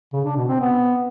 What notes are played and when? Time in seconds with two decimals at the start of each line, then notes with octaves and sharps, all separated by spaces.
0.13 C#3
0.25 D4
0.36 B2
0.48 C4
0.60 B3